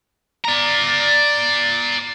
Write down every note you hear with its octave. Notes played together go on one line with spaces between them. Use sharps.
D5 A#5